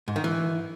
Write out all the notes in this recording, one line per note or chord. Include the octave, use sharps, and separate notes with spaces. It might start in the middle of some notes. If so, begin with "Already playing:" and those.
G#2
D#3
E3